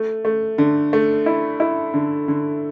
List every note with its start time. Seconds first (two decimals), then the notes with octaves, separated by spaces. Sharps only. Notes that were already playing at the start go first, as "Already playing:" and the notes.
Already playing: A3
0.25 A3
0.58 D3
0.93 A3
1.26 E4
1.60 E4
1.94 D3
2.28 D3